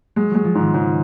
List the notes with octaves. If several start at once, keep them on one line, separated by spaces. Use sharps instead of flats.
F#3 G#3
F#3 G#3
F3
G#2 D#3
G#2 C#3